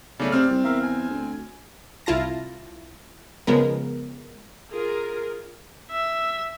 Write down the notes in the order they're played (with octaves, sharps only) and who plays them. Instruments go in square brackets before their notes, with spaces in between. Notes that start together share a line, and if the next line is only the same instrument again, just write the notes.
[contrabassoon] B1 [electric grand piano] C#3 A3 [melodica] D5
[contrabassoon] C3 [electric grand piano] C4 F6
[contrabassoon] C2
[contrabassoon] E2 [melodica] A#4 E5 F5
[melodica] G#5
[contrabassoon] D2
[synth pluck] C2 E4 F4 A5 A#6
C#3 F3 G#3 B3 A#4
[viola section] F4 G#4 A#4
[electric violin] E5